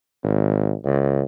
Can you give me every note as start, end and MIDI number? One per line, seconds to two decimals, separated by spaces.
0.23 0.73 32
0.85 1.22 37